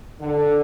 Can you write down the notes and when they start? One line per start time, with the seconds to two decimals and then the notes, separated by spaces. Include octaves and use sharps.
0.21 D3